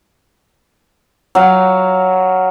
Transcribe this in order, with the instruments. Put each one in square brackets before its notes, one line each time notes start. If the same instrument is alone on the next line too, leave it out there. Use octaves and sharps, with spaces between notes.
[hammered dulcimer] F#3 F5